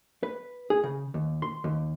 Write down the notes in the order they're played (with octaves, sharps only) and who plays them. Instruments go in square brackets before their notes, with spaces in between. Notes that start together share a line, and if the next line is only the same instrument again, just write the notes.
[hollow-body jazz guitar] B4
G#4
C#3
D#2
C6
D#2